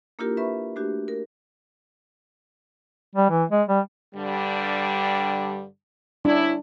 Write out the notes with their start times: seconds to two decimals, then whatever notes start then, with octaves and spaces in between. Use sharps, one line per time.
0.19 A#3 D4 E4 F4 G4 A#4
0.37 B4 E5 B5 C#6
0.76 A3 D4 F#4 G4
1.08 A#4
3.15 G3
3.30 E3
3.51 G#3
3.68 G3
4.15 G2 D3 G3
6.25 C#4 D4 E4